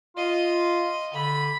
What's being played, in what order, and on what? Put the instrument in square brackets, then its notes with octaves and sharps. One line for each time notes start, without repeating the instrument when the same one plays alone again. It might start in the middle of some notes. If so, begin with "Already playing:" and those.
[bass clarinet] F4 [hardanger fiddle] D#5
[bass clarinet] D3 [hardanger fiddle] B5